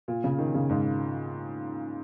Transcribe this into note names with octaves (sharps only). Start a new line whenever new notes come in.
A#2
C#3
D#3
C#3
G#2